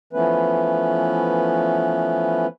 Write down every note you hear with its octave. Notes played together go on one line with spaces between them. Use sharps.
E3 F3 A3 B3 C#4 B4